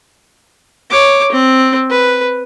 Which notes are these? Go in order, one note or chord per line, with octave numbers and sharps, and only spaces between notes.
C#5 D6
C4
B4